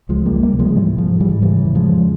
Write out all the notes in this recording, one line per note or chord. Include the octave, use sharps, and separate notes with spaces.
C#2 F3 G#3
G3 A#3
C#2
G3 A#3
C3
F3 G#3
G#3
G#2 E3 G3
G#2 F3
G#2 E3 G3
C#3 E3 G3
E2
F3 G#3
C#3